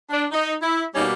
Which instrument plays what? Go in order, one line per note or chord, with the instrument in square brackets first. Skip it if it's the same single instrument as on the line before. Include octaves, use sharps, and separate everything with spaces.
[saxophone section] D4
D#4
E4
B2 G3 A#3 C#4 D#4